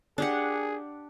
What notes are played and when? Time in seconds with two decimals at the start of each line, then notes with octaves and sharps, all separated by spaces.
0.18 D4 G4 G#4 F#5